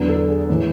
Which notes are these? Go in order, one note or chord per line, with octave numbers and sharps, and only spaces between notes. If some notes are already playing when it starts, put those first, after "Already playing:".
Already playing: E2 D3 F#3 B4
A4
G#4
A2 E3